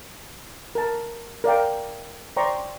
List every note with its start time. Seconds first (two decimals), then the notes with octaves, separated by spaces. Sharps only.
0.75 A#4 A5
1.44 A#4 D5 F5 G5
2.37 C5 D5 G5 A#5 C6 C#6